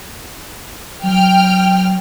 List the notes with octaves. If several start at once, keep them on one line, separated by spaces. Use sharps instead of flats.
F#3 G5 F6